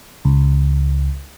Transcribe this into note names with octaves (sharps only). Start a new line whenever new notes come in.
C#2